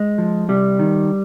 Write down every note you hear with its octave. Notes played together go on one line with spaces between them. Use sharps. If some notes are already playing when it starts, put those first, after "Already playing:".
Already playing: G#3
F3
C3 G3
D#3